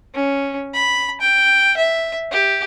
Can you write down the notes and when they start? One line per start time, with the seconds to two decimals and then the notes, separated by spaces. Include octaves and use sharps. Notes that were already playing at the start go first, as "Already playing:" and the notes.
0.14 C#4
0.74 B5
1.21 G5
1.77 E5
2.32 G4